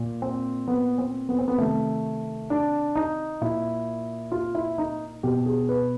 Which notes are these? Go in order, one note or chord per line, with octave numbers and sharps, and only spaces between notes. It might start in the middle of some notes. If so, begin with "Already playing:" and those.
Already playing: A#2
C4
B3
C4
B3
C4
B3
C3 D#3 A3
D4
D#4
A#2 E4
F4
E4
D#4
B2 G4
G#4
B4